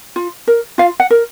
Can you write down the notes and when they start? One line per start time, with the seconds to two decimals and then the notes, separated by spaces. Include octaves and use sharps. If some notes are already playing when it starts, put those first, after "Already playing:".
0.16 F4
0.47 A#4
0.78 F4 F5
1.00 F#5
1.10 A#4